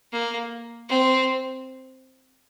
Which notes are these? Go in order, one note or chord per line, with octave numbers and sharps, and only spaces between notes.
A#3
C4